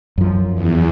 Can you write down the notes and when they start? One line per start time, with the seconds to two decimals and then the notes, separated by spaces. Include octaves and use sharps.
0.18 F#2 F3
0.54 E2